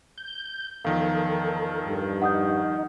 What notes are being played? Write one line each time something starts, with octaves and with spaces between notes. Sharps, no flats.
G6
E2 D#3 F3 A4 A#4 F5
G2
D#4 F#5 D#6 G6